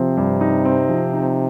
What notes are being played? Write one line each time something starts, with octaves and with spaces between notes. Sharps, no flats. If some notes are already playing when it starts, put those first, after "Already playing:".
Already playing: C3 F3 C4
G2
D#4
C4
F3
D#4